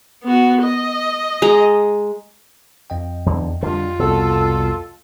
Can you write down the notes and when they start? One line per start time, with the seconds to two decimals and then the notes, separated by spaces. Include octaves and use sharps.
0.24 B3 F#4
0.62 D#5
1.42 G#3 A#5
2.90 F2 D#5 G5
3.26 E2 D3
3.63 D3 G3 F4
3.99 C2 B2 A4